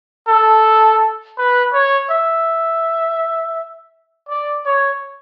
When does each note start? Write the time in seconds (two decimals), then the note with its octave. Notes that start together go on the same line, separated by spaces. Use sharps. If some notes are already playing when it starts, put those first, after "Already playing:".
0.28 A4
1.38 B4
1.74 C#5
2.10 E5
4.29 D5
4.66 C#5